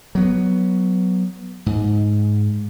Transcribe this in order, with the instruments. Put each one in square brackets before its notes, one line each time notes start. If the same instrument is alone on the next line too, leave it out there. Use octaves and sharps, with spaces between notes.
[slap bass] F#3 B3
G#2